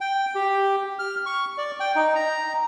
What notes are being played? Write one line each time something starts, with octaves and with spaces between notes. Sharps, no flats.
G5
G4
F6
C#6
D5
G5
D#4
A#5